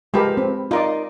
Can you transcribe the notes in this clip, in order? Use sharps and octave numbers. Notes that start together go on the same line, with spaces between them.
F3 G#3 G4 A#4 B4
C4
D#4 F4 A#4 D5 D#5